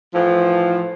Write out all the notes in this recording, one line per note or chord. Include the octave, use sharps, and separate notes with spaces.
A2 E3 F3